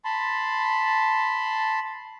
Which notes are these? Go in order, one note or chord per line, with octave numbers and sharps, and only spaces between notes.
A5 B5 C6